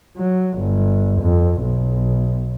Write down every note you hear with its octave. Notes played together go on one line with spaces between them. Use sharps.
F#3
G1
F2
B1